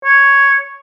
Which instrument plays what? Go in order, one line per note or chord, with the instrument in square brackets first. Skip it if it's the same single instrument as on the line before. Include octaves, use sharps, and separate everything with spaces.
[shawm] C#5